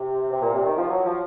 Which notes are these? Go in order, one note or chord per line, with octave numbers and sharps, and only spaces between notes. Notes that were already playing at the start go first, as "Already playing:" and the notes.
Already playing: C3
C3
A#2
C3
D#3
F3
F#3
F3